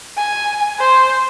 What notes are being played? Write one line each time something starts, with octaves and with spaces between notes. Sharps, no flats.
G#5
C5